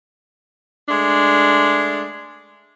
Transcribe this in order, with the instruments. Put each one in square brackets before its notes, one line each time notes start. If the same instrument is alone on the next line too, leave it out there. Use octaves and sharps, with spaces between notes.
[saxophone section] G#3 A3 D4